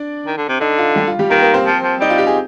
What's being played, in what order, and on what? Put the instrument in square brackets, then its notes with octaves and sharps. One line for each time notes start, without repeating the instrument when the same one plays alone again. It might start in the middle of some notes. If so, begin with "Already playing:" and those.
Already playing: [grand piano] D4 D5
[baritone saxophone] D#3
D3
C3
[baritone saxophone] D3 [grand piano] D#4
[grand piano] F4
G3 G4
F4
G3 G4
[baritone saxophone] D#3 [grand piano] A#3 A#4
[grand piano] A#3 A#4
C4 C5
[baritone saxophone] F3
F3
[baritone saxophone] G3 [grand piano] D#4
[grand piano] F4
G4
G#4